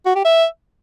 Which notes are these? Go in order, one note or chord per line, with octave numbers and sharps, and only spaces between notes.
F#4
G4
E5